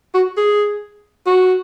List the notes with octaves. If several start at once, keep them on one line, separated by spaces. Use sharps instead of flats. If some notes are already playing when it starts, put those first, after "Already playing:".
F#4
G#4
F#4